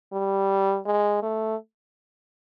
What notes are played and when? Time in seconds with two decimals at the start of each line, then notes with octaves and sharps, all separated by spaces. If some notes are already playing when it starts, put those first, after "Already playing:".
0.13 G3
0.85 G#3
1.22 A3